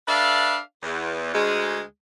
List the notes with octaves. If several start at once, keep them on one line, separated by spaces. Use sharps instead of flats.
D4 A4 B4 D5 E5 F5
E2
D2 G#3